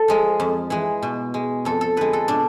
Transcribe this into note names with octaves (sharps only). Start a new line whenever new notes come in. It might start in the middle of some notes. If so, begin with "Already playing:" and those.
Already playing: A4
F3 G#3
F2
E3 G#3
B2
G#3
F2 A4
A4
D3 G#3 B4
A4
B2 D4